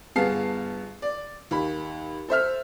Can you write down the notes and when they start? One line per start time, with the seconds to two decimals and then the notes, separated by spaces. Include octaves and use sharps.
0.16 G1 B3 G#4 F5 A5 C7
1.02 D5
1.51 D#2 B5
2.28 A4 C5 E5 F6